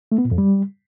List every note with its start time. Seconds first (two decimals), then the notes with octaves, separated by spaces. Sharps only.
0.12 A3
0.18 B3
0.25 A#2
0.31 F2
0.38 G3